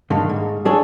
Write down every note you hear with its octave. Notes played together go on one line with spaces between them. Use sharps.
G2 D3 D#3 A#3
G#2
F#3 D4 G#4 A4 C#5